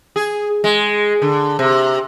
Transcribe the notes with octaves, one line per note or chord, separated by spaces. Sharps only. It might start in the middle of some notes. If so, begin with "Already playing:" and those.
G#4
G#3
D3
C3